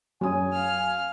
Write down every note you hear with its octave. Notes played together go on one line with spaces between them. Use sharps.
F#2 F#3 C#4 G#5 D#6
F5 F6